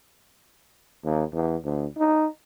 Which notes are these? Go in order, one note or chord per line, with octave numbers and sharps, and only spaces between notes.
D#2
E2
D2
D#4